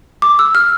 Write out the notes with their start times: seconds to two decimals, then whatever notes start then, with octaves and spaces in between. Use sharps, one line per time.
0.22 D6
0.39 E6
0.55 F6